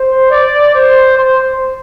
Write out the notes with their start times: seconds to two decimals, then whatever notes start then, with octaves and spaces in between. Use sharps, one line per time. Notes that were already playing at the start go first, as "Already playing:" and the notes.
Already playing: C5
0.31 D5
0.74 C5
1.17 C5